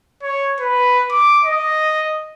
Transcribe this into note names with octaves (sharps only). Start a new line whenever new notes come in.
C#5
B4
D6
D#5